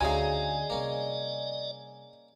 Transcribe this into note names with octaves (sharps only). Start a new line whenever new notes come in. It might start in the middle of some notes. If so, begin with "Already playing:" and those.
D2 C#3 F#3 D#4 G#4 D5 D#5 G#5
C3 G3 A#3 C#4